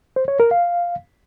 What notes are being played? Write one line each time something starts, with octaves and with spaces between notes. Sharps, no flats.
C5
C#5
A#4
F5